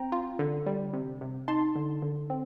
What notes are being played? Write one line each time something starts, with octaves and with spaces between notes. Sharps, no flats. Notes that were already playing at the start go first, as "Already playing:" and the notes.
Already playing: C4 G5 A#5
F4
D3
G3
C3
C3
D#4 A5 C6
D3
D3
C4